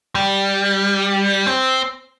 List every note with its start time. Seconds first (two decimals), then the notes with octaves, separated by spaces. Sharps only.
0.15 G3
1.46 C4